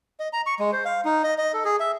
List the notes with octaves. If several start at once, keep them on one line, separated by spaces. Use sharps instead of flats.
D#5
A#5
C#6
G#3
C5
F5
D#4
D#5
D#5
A4
G#4
E5